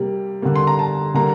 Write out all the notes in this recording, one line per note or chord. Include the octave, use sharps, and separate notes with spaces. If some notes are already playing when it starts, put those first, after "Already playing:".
Already playing: C3 G3 A#3
D3 G3 A#3
C6
A#5
A5
D3 G3 A#3 A#5